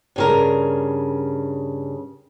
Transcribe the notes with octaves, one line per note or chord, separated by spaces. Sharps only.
G2 C#3 A#4